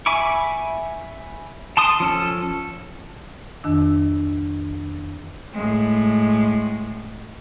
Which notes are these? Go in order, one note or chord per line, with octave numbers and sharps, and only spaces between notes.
E5 G#5 B5 C#6 D6
A5 C6 D#6
F3 C#4 A4
F2 D#3 D4 E6
A2 G#3